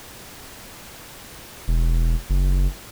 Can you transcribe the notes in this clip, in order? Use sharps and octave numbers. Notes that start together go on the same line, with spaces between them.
E1
F#1